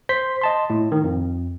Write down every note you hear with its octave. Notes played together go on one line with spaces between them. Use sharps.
C5 C6 B6
D#5 A5 C6
A2
D#3
F2